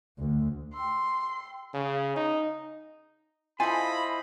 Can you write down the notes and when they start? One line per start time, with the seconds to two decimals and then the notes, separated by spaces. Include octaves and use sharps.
0.18 D2
0.74 G5 C6 E6
1.74 C#3
2.16 D#4
3.60 E4 F4 A4 C5 D#5 G#5 B5